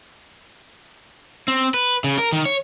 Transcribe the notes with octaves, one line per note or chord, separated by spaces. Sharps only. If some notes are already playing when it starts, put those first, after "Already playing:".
C4
B4
C#3
A#4
D#3
C#5